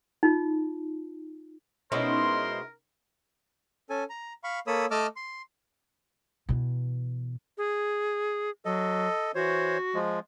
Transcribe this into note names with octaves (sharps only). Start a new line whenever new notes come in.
D#4 F4
B2 G#3 C#4 D#4 E4 A#4 C5 C6
C#4 A4 G#5
A#5
F5 B5 C#6
A#3 A4 C#5 B5 D#6 E6
A3 D#5 A5 D6 E6 F6
C6
B2 E3
G#4
F#3 A4 D#5
E3 F#4 C5 C#5
F3 G#3